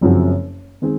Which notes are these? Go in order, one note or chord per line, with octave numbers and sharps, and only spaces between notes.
F#1 F#2 F3 C4 F#4
D#3 G#3 C4